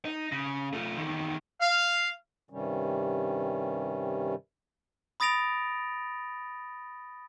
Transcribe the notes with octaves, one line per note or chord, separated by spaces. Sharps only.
D#4
C#3
A3 F4
E2 D#3
F5
G2 C3 D#3 G3 C#4
B5 D#6 A6 A#6 D7 F7